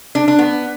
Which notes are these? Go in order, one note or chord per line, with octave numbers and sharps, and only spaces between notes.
D4
D4
B3